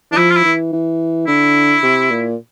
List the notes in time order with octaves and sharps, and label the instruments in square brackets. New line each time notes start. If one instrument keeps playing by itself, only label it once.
[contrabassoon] E3 [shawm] D4
[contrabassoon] F3 [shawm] E4
[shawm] F4
E4
[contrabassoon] E3
E3
[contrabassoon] D3 [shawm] E4
[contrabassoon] C3
A#2